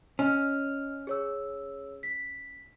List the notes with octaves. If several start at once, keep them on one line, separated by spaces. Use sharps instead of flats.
C#4 D#5 F6
G#4 C#5 E6
B6